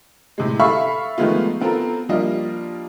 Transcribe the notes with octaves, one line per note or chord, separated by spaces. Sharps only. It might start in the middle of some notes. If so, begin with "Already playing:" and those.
A2 C3 G#3
A4 E5 F5 B5 C#6 E6
D#3 F3 G#3 A3 B3 F4
B3 C4 F4 A4 A#4
F3 G3 A#3 D4 F4 D#5